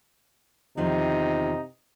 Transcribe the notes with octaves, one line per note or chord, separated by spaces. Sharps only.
E2 C3 D#3 F3 D#4